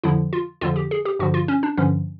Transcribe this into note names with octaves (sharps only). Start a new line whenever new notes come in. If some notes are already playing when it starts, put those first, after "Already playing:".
F2 D3 F3 E4
F4
F2 D3 F3 F4
G4
G#4
G4
G2 D3 F3 F#4
F4
C#4
D4
G2 D3 F3 C#4